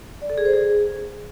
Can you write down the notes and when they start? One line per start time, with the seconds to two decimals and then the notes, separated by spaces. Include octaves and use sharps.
0.22 D5
0.30 A4
0.38 G#4
0.45 C5
0.53 G#4